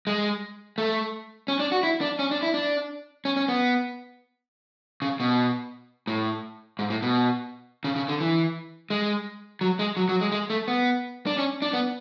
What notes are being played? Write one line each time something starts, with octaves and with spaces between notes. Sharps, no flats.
G#3
A3
C#4
D4
F#4
E4
D4
C#4
D4
E4
D4
C#4
C#4
B3
C#3
B2
A2
G#2
A2
B2
C#3
C#3
D3
E3
G#3
F#3
G#3
F#3
F#3
G#3
G#3
A3
B3
D4
C#4
D4
B3